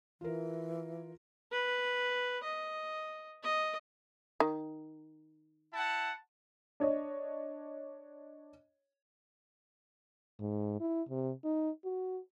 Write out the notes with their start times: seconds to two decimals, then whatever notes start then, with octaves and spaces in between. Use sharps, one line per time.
0.21 E3 F4 A#4
1.51 B4
2.44 D#5
3.43 D#5
4.40 D#3
5.73 E4 F#5 A5
6.80 D4 C#5 D#5
10.40 G#2
10.80 E4
11.09 C3
11.45 D#4
11.85 F#4